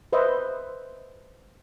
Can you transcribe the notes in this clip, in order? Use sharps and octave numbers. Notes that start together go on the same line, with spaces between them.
B4 C5 D#5 E5